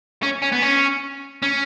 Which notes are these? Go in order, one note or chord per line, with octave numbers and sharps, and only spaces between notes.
C#4
C#4
B3
C#4
C#4